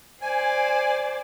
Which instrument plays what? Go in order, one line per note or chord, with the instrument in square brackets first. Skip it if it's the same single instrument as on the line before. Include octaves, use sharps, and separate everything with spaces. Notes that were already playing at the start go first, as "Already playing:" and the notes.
[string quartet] C5 D5 [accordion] G#5